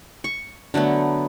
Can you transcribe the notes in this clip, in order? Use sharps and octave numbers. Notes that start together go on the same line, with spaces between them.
C#6
D3 F#3 A3 B3